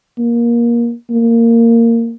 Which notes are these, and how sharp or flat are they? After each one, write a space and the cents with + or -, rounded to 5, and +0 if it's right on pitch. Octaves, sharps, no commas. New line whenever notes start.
A#3 +20
A#3 -15